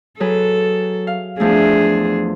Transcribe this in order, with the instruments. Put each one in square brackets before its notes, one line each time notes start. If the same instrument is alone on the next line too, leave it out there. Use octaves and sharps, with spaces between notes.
[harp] F#3 G#4 B4 [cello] A4
[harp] F5
[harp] E2 F3 A3 [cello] D4 G#4